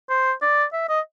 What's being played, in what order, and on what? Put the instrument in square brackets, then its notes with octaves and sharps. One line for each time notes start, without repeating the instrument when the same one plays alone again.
[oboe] C5
D5
E5
D#5